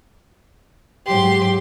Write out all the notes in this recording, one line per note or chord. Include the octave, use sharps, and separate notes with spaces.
G#2 F#3 G4 C6